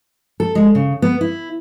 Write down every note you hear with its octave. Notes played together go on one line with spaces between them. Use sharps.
A4
G#3
C#3
B3
E4